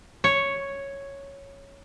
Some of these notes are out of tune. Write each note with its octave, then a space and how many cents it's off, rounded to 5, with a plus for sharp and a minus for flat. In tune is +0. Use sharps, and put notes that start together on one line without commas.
C#5 +0